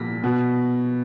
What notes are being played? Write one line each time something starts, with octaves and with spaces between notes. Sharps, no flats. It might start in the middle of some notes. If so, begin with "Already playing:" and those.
Already playing: A#2 A#6 B6
B2